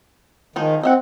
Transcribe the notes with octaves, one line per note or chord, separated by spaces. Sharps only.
D#3 F3 G#3 D#4
C4 D#5 E5 F#5